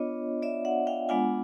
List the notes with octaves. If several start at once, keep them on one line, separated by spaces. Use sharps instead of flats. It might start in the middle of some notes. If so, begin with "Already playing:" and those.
Already playing: B3 D4 F4 C#5 D#5
D5 E5
E5 F#5
F5 G5
G#3 B3 D4 F4 F#5 G#5